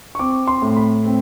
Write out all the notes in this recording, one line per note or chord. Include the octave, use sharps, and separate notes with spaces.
C#6
C4 D6
C6
A2
B5
C4